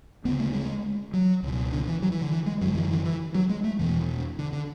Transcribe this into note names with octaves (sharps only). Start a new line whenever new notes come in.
D2 C#3 B3
A3
G#3
F#3
C#2 B2
D3
E3
F#3
E3
D3
E3
G#3
F#2 D3 F#3
E3
E3
E3
F#3
G#3
A3
E2 B2 E3
D3
D3